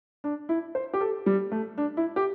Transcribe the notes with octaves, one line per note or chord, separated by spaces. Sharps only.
D4
E4
C5
G4
A4
G3
A3
D4
E4
G4